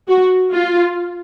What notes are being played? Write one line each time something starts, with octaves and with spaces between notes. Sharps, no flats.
F#4
F4